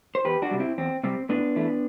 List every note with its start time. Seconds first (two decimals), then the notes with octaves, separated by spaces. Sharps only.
0.15 C5
0.25 E2 G4 B4
0.42 D4 F#4
0.51 C3 G3
0.60 C4 E4
0.78 E2 C4
1.03 C3 G3 C4
1.29 A2 B3 D4
1.56 E3 A3